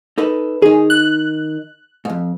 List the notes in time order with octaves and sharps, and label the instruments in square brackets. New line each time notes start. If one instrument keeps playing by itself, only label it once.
[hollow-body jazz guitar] D#4 A4 B4
[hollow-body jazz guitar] D#3 D#4 [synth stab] G#4
[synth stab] F#6
[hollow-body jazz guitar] F2 G#2